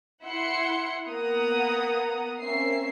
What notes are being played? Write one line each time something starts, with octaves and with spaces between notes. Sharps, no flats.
E4 E5 F#5 C6 C#7
A#3 B3 F#5 A#5 D#6
A#3 C4 C#4 E5 C7